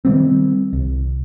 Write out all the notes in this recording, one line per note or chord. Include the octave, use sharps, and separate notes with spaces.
D#3 G3 C4
C2